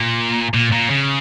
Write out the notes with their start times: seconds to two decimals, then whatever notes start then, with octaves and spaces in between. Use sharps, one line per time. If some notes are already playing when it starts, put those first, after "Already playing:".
Already playing: A#2
0.54 A#2
0.72 A#2
0.90 C#3